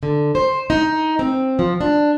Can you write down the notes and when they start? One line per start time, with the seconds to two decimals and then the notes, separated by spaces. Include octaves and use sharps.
0.03 D3
0.35 C5
0.70 D#4
1.19 C4
1.59 F3
1.81 D4